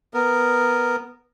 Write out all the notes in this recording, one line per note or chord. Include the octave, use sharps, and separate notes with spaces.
B3 A#4